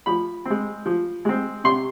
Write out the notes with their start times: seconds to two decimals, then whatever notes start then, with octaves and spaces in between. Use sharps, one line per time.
0.06 F3 B5
0.45 G#3 C4
0.86 F3
1.25 G#3 C4
1.64 C3 C6